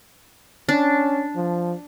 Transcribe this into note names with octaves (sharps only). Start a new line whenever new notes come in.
C#4 D4
F3